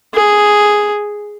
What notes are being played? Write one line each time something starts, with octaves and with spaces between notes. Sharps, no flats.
G#4